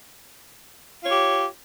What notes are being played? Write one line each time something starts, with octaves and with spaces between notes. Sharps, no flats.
F4 G4 C#5